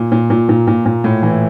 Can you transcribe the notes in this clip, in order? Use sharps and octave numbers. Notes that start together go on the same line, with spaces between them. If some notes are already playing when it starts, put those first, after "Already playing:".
Already playing: A#2
A#2
A#2
A#2
A#2
A#2
A2
E3